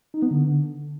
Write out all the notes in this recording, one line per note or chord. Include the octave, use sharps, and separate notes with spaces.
D#4
B3
D3